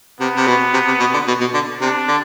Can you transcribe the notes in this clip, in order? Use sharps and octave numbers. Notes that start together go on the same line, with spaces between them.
C3 B3
C3
B2
C3
C3
B2
D3
B2
B2
D3
C3 D4
D3